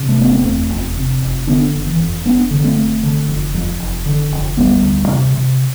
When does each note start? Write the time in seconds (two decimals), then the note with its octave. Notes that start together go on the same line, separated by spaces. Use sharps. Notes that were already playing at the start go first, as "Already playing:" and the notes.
Already playing: C3
0.09 A3
0.19 F1 B3
0.32 A3 C4
0.44 E2
0.70 F1
0.96 C3
1.21 F1
1.47 D3 B3 D4
1.74 F1
1.87 E3
2.00 F2
2.25 F1 B3 D4
2.51 D3
2.64 A3 C4
2.77 F1
3.03 D3
3.28 F1
3.54 F2
3.79 F1
4.06 D3
4.32 F1
4.57 D2 G3 B3
4.83 D2
5.08 C3
5.34 C3